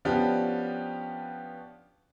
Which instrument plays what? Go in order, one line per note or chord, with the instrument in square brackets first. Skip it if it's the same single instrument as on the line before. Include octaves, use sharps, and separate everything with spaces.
[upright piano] F3 B3 C#4 D4 F#4 G4